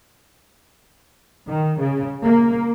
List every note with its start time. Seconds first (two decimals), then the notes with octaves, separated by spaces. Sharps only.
1.49 D#3
1.79 C#3
2.23 A#3